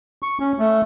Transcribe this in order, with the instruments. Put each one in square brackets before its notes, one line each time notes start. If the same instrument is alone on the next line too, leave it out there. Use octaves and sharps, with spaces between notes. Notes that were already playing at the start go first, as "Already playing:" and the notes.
[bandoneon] C#6
C#4
A3